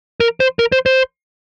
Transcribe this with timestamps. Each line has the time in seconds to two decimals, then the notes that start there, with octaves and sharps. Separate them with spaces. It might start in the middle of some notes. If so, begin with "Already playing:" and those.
0.20 A#4
0.40 C5
0.59 A#4
0.72 C5
0.86 C5